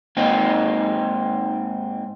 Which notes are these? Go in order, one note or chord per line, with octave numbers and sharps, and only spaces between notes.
G#2 A#3 C4 D#4